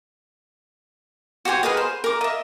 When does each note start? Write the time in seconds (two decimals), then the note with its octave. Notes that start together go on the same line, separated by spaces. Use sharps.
1.45 F#4 G4 C5 G#5
1.63 G#4 A#4 B4 D#5
1.77 C5
2.04 A#4 D6
2.21 D#5 E5